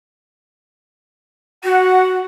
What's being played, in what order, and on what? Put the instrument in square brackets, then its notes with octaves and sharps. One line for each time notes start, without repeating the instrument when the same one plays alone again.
[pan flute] F#4 [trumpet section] F#5